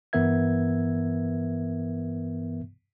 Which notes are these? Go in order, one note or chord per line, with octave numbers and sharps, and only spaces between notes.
G2 E3 B3 A#4 E5 G#6